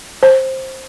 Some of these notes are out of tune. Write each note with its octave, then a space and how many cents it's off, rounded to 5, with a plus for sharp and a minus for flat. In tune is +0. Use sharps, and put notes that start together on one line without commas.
C5 +15